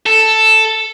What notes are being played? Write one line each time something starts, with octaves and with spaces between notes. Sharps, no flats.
A4